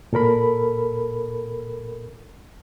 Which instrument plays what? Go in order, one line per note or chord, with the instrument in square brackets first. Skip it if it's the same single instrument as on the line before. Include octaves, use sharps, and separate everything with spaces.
[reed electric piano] A#2 A4 A#4 B5